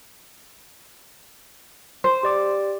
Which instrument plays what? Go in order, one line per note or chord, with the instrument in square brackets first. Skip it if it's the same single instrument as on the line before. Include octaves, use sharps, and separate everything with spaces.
[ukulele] C5 [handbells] C6
[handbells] G4 D5 D6